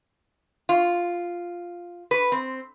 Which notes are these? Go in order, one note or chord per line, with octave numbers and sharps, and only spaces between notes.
F4
B4
C4